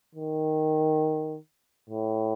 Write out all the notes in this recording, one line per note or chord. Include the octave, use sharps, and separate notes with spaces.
D#3
A2